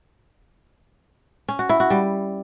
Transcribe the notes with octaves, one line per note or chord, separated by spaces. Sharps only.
C#4
F#4
E4
F#4
G3